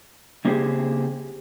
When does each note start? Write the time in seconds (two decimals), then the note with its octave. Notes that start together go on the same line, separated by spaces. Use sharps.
0.45 C#3 A#3 C4 G4 G#4